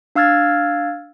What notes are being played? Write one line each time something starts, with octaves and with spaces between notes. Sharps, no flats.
D4 F5 E6 F6 G#6 A6